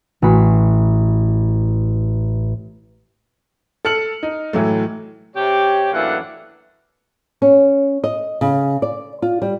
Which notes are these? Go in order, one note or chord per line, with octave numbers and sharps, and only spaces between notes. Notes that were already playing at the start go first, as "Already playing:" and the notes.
A1 F#4 B5 C7
A4 F6 C#7 F#7
D#4
A2 E3 F#3 A3
C3 G4 C#5
F#2 A2 E3 A#3 D4 F#5
C#4
D#5
C#3
D5
F4
G3